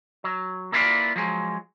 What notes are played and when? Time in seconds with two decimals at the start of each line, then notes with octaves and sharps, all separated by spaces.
0.24 F#3
0.72 A#3 E4 F4 G#4 B4 D5
1.16 F3 F#3 G#3